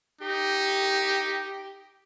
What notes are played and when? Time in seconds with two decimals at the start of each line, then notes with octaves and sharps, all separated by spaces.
0.21 D#4 G4